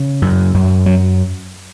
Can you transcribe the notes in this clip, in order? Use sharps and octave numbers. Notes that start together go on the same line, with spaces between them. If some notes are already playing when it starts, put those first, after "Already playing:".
Already playing: C#3
F#2
F#2
F#3